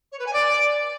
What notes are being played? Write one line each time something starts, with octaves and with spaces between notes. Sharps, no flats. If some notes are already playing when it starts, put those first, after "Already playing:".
C#5
B4
G#5
D5